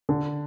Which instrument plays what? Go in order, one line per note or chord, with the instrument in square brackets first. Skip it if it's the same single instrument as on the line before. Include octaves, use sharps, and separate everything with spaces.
[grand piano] D3